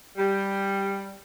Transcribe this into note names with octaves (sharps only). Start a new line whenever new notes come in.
G3